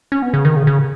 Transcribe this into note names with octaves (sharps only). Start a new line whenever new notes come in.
C#4
B3
C#3
D#3
C#3
C#3